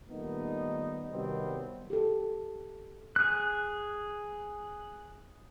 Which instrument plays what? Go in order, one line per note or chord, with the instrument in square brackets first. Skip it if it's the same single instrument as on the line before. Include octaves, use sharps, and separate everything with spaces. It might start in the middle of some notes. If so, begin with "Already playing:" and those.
[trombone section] A#2 D#3 G3 A3 B3 D#4
C3 D#3 F#3 G3 B3 C4
[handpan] G4 A4
[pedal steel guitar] G#4 F#6